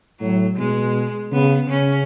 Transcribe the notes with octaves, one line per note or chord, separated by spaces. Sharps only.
A2 F#3
B2 G#3
C#3 B3
C#3 C#4